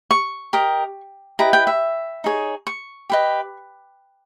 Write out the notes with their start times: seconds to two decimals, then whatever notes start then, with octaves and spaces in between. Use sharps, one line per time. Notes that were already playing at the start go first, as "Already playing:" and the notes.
0.11 C#6
0.53 G4 A#4 D#5
1.39 E4 G4 B4 D#5 A#5
1.53 G5
1.67 E5
2.24 D#4 G#4 C#5
2.67 C#6
3.10 G4 B4 D#5